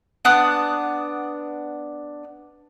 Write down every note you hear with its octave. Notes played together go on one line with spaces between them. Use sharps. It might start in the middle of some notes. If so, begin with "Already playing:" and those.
B3 D4 D#6 F#6